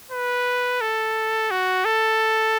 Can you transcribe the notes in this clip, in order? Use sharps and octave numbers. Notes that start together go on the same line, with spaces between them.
B4
A4
F#4
A4